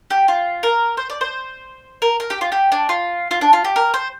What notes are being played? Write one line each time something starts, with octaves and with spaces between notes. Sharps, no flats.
G4
F4
A#4
C5
D5
C5
A#4
A#4
G4
F4
G4
D4
F4
F4
D4
F4
G4
A#4
C5